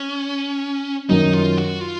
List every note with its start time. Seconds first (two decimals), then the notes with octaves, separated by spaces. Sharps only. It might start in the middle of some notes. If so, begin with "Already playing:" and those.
Already playing: C#4
1.09 F#2 D#3 F#3 D#4
1.33 F4
1.57 F#4
1.81 F4